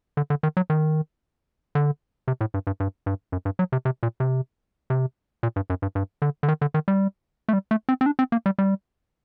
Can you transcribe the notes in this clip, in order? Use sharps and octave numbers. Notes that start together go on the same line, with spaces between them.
D3
D3
D#3
F#3
D#3
D3
C3
A2
G2
G2
G2
G2
F#2
G2
F#3
C3
C3
A#2
C3
C3
A#2
G2
F#2
G2
G2
D3
D3
D#3
D3
D#3
G3
A3
G3
A3
C4
C4
D4
C4
A#3
G3
G3